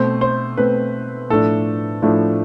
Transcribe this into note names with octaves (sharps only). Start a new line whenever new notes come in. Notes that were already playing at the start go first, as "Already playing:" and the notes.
Already playing: B2 A3 C4 C5
C5
B2 A3 C4 B4
A2 F3 A3 D4 A4
A2 F3 A3 D4